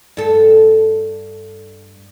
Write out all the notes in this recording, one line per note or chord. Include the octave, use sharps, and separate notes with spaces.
G2 A4